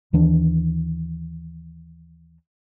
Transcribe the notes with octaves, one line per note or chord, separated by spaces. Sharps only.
D#2 D#3 E3 D4